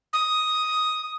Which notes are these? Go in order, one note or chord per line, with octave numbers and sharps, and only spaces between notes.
D#6